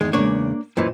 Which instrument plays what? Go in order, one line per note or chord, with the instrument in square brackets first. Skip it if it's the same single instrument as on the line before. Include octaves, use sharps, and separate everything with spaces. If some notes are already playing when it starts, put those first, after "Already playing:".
[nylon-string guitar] E2 D#3 D#4 [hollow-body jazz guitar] G#3
[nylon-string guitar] E2 C#3 G#3 [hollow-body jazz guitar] A#3 D4 C#5
[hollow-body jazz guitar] F#2 A#2 E3 [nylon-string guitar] C5 D#5